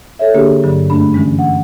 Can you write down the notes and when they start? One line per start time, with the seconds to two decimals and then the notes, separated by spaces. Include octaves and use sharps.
0.19 A4 C#5 E5
0.34 D3 A#3 D4 G4 G#4
0.63 G2 D3 F#3
0.90 F#2 A3 D4 B5
1.13 D3 E3 G#3 C#4
1.39 F#5